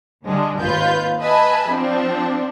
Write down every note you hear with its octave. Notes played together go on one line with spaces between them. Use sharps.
D3 G3 G#3 D4
G#1 D#2 F4 B4 G6
B4 D#5 E5 G#5 A5 B5
F3 C4 D4